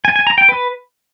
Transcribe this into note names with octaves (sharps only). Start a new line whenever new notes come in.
G#5
G#5
A#5
G5
B4